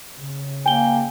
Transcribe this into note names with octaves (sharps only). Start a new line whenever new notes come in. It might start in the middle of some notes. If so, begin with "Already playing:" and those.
C#3
A#3 G5 G#5 G7